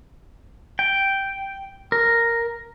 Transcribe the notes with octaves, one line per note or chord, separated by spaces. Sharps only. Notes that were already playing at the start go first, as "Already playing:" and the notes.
G5
A#4